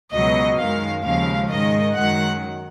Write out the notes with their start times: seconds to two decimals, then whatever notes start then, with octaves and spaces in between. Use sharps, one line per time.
0.13 C#2 B2 F#3 D#5
0.58 F#2 D#3 G#3 F5
1.05 D#2 C#3 F3 G#3 F5
1.51 G#2 D#3 G#3 D#5
1.96 F#2 D#3 G#3 F#5